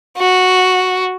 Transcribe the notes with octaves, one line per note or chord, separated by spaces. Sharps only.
F#4